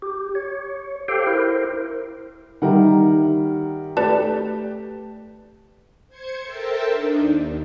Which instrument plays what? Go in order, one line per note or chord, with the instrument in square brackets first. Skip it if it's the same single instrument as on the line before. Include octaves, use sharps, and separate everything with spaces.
[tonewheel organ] G4
C#5
G4 A4 C5 F5 G5
E4 A#4 C5
[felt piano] D#3 G3 E5 [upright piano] A#4 F#5
[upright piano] A3 G4 [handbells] B4 D5 A5
[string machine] C5 G#6 C#7
A4 A#4 C5 E5 G5 A5
D4 D#4
D#2